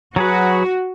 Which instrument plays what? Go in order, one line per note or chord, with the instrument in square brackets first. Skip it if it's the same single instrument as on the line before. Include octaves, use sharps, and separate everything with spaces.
[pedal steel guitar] F#3 G#4 B4 [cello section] F#4